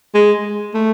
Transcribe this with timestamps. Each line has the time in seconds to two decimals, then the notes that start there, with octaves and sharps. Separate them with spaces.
0.14 G#3
0.74 A3